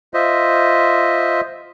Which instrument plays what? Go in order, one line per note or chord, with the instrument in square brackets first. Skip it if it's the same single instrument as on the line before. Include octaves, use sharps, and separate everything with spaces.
[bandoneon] F4 C5 D#5 E5